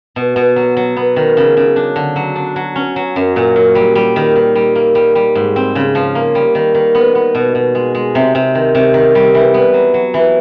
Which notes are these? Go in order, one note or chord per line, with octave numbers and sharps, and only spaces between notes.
B2
B2
F#3
F#3
B3
D#3
C#3
C#3
D4
D3
F#3
D4
F#3
C#4
F#3
F#2
A#2
F#3
G3
G3
D#3
D#3
G3
A#3
G3
G3
G#2
C4
C#3
F3
A#3
G3
D#3
D#3
B3
B3
B2
B2
G#3
G#3
C3
C3
D#3
C3
D#3
G3
E3
B3
F#3
F#3
E3